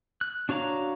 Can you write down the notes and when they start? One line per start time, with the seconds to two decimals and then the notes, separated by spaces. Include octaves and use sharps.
0.21 F#6
0.49 D4 F#4 C#5 F5 A#5